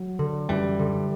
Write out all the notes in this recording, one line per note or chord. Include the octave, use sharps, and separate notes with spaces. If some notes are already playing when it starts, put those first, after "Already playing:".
Already playing: F#3
D3
F#2 E3 G3
D3